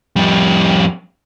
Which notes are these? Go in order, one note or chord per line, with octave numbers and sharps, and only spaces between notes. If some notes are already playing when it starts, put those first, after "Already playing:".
F2 G3